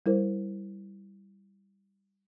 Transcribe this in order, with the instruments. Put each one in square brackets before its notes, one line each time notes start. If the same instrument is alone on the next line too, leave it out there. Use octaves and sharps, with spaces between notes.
[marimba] G3 E4 A#4 C5